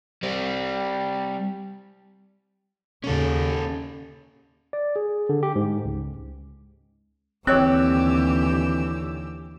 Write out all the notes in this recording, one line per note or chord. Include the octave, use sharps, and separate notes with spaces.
G3 C4
D#2 C#3 C#4 A4
D5
G#4
D3
G4
G#2
C#2
D#2 D3 E3 C4 G4 C#5 E6 F#6